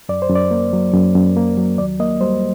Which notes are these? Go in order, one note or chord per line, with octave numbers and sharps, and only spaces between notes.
F#2 D5
C5
F#2
D5
A#3
F#3
F#2
F#2
A#3
F#3
D#2 D5
A#3 D#5
G3 C5